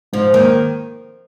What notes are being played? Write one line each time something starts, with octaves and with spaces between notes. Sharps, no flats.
G#2 F3
D#3 A#3